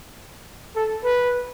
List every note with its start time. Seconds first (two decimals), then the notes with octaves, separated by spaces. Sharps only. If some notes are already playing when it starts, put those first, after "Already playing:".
0.76 A4
1.04 B4